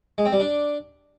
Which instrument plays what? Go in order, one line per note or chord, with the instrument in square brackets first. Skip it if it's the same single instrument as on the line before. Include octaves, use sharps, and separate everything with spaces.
[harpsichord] G#3
C4
G3
D4